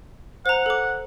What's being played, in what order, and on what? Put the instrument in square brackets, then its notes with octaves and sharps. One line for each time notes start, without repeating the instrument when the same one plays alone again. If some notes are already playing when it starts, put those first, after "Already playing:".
[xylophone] C5 A#5 [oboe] F#5
[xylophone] A4 D6